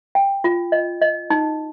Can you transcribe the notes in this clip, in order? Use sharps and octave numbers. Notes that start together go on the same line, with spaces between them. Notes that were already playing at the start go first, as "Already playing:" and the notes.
G5
F4
D#5
D#5
D#4